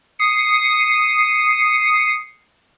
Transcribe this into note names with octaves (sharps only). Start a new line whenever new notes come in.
D#6 C7 C#7